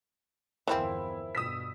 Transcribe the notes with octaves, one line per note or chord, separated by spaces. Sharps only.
G1 E2 E3 F3 C4 E4 A#4 C5
G2 B2 D#6 E6 B6